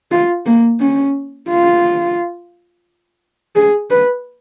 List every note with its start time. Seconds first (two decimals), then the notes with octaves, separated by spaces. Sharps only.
0.12 F4
0.46 A#3
0.80 C#4
1.49 F4
3.56 G#4
3.90 B4